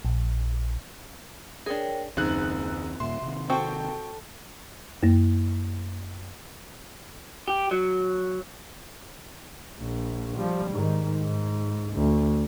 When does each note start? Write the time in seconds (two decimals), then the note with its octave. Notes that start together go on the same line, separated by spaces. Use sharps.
0.05 A#1
1.66 D4 G#4 A#4 C#5 G5
2.17 F#1 D#2 C4 D#4 G#4 A#5 E6 F#6
3.00 D#2 A#2 E5 C6
3.22 C3 D#3
3.50 C4 F#4 A4 C5 G5 A5 C#6
5.03 F#2 A#3
7.48 G4
7.71 F#3
9.80 A#1
10.37 F3 G3
10.72 G#2 D#3
11.23 G#2
11.94 D2